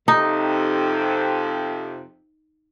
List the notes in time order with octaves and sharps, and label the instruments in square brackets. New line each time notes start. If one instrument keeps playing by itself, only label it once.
[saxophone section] F2 C3 [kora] D#4